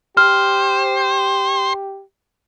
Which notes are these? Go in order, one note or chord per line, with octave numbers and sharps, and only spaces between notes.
G4 C5 F6